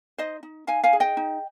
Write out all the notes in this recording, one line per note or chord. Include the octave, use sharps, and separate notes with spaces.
D#4 C5 D#5
D#4
D#4 F5 G#5
F5 G#5
G#4
D#5 G5
D#4